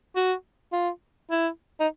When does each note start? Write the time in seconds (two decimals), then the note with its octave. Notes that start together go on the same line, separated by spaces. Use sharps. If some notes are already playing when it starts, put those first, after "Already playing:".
0.16 F#4
0.72 F4
1.31 E4
1.80 D#4